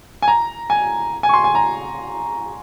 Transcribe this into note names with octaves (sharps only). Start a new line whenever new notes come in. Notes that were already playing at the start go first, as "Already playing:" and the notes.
G#5
A#5
G#5
G#5
C#6
C6
G#5
A#5